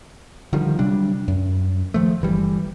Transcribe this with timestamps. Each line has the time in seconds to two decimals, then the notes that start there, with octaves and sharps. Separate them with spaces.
0.53 D3 D#3 F3 G3
0.79 C3 F#3 G3 D4
1.28 F#2
1.94 D#3 F3 A3
2.22 G1 E3 G3